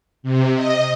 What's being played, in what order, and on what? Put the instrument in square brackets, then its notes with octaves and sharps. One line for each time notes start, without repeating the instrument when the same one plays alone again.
[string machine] C3
D#5